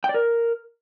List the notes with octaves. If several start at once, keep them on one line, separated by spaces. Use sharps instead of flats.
G5
D5
A#4